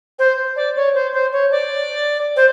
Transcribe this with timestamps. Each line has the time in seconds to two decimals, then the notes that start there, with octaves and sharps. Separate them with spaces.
0.19 C5
0.56 D5
0.76 C#5
0.94 C5
1.13 C5
1.32 C#5
1.51 D5
2.36 C5